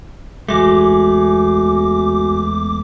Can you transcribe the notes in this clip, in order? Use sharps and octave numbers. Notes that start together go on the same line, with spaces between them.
E2 G#3 A3 F#4 G#5 D6